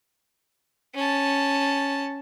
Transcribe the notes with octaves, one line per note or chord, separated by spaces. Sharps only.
C#4 A5